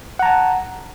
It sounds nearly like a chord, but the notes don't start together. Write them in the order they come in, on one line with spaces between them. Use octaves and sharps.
F#5 A#5 A5